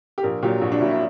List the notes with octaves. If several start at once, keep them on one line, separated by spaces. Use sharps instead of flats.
G4
A#1 A#4
A#2 F#3 G4
A#1 F#4
D4
A#2 F#3 E4
E4